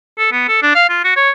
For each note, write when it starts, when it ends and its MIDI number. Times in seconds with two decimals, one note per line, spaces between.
0.18 0.29 69
0.32 0.45 59
0.48 0.63 69
0.63 0.74 62
0.75 0.85 77
0.89 1.00 65
1.04 1.14 66
1.16 1.31 73